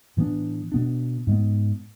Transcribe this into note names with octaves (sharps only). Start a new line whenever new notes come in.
A2 E3 B3 D4
B2 B3 D4
G#2 G#3 B3